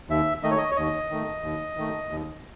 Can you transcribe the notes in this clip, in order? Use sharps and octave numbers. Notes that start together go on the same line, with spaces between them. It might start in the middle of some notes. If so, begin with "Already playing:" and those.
D#2 E5
D#3 A3 D#5
C#5
D#5
C#5
D#2 D#5
D#3 A3
D#2
D#3 A3
D#2